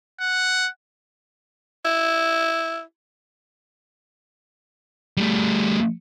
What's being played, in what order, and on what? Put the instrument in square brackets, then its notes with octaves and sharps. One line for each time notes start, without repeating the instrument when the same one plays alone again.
[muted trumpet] F#5
[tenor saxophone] E4
[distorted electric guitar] G3 A3